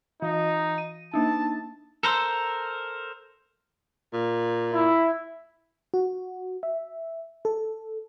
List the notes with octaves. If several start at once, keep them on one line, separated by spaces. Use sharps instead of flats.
E3 D#4
D#7
A#3 D4 D#4 A5
A4 A#4 C5 C6 E6
A#2
E4
F#4
E5
A4